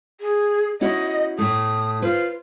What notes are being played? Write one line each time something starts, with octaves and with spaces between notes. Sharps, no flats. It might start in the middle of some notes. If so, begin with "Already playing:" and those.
G#4
C#4 E4 F#4 D#5
A2 A3 D#6
F4 B4 C5